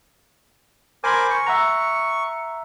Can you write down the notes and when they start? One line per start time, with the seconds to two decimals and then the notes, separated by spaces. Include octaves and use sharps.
1.04 A#4 C5 G#5 B5 D6 G#6
1.30 C#6
1.46 E5 F#5 A#5